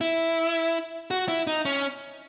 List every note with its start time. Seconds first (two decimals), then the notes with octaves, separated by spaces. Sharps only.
0.01 E4
1.11 F#4
1.28 E4
1.47 D#4
1.65 C#4